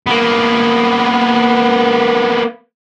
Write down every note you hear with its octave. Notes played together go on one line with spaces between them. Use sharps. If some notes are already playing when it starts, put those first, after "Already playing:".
A#3 B3